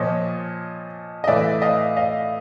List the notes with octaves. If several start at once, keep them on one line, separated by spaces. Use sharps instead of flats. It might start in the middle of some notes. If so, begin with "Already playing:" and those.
Already playing: A#2 F3 C#5 D#5
D#5
A2 E3 D5 E5
D#5 F5
D#5 F5